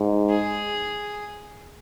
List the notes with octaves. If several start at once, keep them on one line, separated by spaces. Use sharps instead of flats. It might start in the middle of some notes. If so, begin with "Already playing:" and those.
Already playing: G#2
G#4